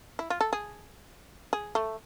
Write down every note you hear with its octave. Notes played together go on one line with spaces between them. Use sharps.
E4
F4
A4
G#4
G#4
A3